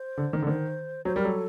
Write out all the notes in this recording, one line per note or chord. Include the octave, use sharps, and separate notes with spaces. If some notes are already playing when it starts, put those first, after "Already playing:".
Already playing: C5
D3
D#3
D3
D#3 C5
F#3 C5
G3 A#4
F#3 A4